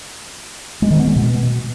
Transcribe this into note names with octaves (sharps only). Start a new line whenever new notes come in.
G#3
D#3
B3
G#3
B2